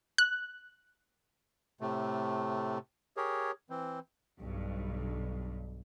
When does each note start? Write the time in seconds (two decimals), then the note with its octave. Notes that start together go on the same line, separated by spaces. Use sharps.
0.18 F#6
1.81 A2 C3 A3
3.17 G4 G#4 A#4 C#5
3.70 E3 C4
4.39 B1 G2